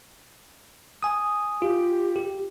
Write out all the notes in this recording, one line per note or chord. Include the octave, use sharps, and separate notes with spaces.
G#5 D#6
F4 G4
G4